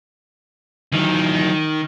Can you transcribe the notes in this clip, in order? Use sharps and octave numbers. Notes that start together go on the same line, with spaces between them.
D#3 E3 F#3